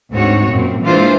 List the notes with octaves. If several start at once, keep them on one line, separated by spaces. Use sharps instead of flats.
D2 G#2 C4 F#4 C#5
F#2 A#2 C4
E3 G#3 A#3 D4 F4 C5